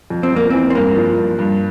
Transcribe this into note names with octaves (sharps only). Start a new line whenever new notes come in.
F2
C4
F2 A#3
E3 C4
C4
G2 A#3
F3
G2
G2